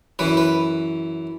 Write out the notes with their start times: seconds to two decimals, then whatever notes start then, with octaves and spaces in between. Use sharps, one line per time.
0.19 F#2 E3 B4
0.37 B4